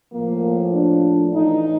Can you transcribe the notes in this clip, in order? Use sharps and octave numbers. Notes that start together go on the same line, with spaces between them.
A2 F3 A#3
D4
A2 E3 D#4